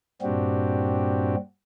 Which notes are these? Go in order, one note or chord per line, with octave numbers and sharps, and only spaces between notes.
G2 A#2 C4 D4 F#4 G4